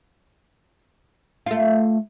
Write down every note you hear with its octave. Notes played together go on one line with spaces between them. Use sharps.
A3 F4